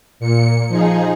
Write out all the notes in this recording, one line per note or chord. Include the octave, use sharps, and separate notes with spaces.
A#2 C#7
F3 D#4 G#4